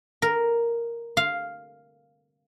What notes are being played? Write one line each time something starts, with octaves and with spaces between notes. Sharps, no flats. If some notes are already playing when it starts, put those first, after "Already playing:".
A#4
F5